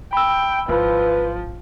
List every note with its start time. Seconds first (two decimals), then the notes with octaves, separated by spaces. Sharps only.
0.13 G5 B5 E6
0.69 G#1 F3 E4 B4